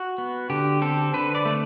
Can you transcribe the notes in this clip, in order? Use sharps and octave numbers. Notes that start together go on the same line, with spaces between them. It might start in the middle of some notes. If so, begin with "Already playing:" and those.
Already playing: F#4
B3
D3 G4
C4 A4
D3 B4
D5
A3